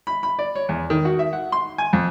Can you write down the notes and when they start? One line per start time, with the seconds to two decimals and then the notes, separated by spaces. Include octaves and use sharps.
0.07 B5
0.23 B5
0.39 D5
0.55 C#5
0.69 E2
0.90 D#3
1.05 F#4
1.19 E5
1.33 F#5
1.52 C6
1.78 G#5
1.93 F2